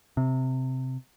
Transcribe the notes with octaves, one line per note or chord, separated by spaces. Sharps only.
C3